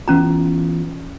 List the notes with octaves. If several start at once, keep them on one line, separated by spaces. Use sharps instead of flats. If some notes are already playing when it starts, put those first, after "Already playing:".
E3 B3 C#4 F4 A#5